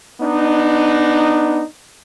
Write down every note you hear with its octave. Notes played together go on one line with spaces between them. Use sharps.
B3 D4 D#4